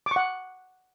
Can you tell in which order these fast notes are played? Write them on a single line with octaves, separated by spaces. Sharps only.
D6 C#6 F#5